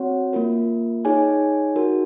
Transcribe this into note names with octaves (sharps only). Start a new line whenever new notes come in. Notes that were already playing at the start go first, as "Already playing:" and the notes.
Already playing: C4 F#4 C#5 F#5
A#3 F4 A#4
D#4 G#4 C#5 G#5
D#4 F#4 A#4